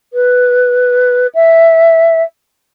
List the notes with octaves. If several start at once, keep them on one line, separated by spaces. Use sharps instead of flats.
B4
E5